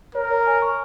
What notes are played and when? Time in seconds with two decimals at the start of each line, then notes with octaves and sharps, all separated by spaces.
0.15 A#4 C#5
0.31 C#5
0.47 G#5
0.62 C#6